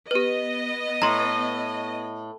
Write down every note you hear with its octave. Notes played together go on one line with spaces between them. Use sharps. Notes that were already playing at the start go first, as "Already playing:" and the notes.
B3 G4 B4 D#5
A2 A#5 C6